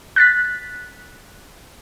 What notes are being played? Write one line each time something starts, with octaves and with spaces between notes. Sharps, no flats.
F#6 A6 B6